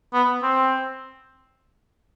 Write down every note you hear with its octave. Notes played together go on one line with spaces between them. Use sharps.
B3
C4